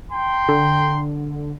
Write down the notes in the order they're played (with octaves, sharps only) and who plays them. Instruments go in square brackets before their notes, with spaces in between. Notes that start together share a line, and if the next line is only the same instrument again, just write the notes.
[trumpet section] G5 A#5 C6
[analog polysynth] D3